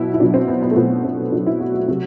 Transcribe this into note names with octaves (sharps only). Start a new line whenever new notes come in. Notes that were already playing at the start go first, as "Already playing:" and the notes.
Already playing: B2 F#3 E4
E4
B2 F#3 D4
C4
B3
B3
A3
B2 F#3 B3
C4
B2 F#3 D4
E4
F#4
F#4
C3 F#3 F#4